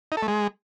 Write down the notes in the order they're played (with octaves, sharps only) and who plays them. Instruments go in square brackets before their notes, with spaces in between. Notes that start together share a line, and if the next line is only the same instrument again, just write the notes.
[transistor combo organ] D#4
A4
A3
G#3